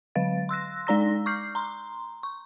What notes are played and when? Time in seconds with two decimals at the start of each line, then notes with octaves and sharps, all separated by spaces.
0.15 D3 F#3 F5 A6
0.49 C6 E6 F#6 A#6
0.87 G#3 D#4 D5 A#5 E6 A#6
1.26 C#6 D6 F6 G6 C7
1.55 A#5 C6
2.23 C#6